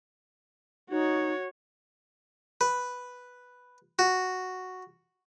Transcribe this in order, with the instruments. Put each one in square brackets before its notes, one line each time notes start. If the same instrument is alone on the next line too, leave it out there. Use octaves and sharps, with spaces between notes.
[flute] D#4 [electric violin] F#4 C#5
[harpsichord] B4
F#4